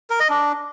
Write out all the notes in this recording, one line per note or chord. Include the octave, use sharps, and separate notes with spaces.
A#4
D#5
D4